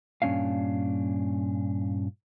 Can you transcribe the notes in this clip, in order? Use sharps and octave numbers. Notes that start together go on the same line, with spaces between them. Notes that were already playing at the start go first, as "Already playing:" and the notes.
G2 A#2 G#3 C#4 D4 F5